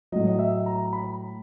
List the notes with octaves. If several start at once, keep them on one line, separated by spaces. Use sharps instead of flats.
A2 F#3 D#5
D#5
E5
A#5
B5